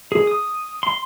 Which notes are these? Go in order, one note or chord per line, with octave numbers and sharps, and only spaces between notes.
G#4
D#6
C6